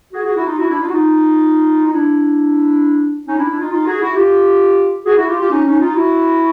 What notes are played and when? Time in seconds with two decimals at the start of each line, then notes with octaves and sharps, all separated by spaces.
0.13 F#4 G#4
0.24 F#4 G#4
0.36 E4 F#4
0.46 D#4 F4
0.58 E4 F#4
0.69 D4 E4
0.80 D#4 F4
0.88 F#4
0.92 D#4 F4
1.87 D#4
1.92 D4 E4
3.27 C#4 D#4
3.37 D4 E4
3.49 D4 E4
3.60 D#4 F4
3.71 D#4 F4
3.86 F#4 G#4
4.01 E4 F#4
4.16 F4 G4
5.06 F#4 G#4
5.16 E4 F#4
5.28 F4 G4
5.39 F4 G4
5.50 C#4 D#4
5.66 C#4 D#4
5.80 D#4 F4
5.95 E4 F#4